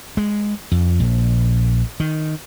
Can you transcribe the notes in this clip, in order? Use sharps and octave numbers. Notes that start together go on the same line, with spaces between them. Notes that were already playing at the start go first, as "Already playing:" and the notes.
G#3
F2
A#1
D#3